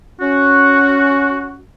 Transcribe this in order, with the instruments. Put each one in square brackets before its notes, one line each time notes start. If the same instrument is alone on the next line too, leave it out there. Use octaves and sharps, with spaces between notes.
[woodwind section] C#4 F#4